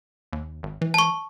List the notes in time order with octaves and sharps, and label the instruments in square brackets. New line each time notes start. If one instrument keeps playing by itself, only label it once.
[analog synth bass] D#2
G#1
E3
[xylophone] A5 C#6